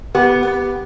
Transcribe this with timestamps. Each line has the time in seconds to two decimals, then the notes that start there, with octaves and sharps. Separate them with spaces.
0.15 B3 G4
0.45 B3